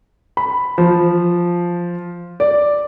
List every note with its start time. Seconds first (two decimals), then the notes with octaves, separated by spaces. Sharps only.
0.37 B5
0.78 F3
2.40 D5